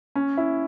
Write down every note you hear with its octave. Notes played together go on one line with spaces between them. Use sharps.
C#4
E4